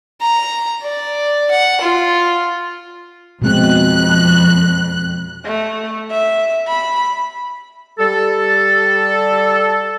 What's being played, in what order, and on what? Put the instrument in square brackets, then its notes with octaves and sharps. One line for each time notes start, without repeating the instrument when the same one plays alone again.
[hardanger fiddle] A#5
D5
F#5
F4
[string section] F2 F#6 [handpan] B2 G#3 C4
[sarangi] A3
E5
B5
[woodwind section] G3 A4